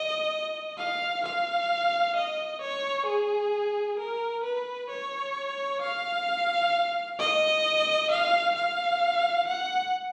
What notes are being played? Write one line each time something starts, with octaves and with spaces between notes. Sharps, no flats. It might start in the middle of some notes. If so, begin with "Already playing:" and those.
Already playing: D#5
F5
F5
D#5
C#5
G#4
A#4
B4
C#5
F5
D#5
F5
F5
F#5